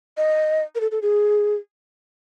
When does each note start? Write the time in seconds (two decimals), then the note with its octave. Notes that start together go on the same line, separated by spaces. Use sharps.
0.17 D#5
0.75 A#4
0.81 A4
0.91 A4
1.02 G#4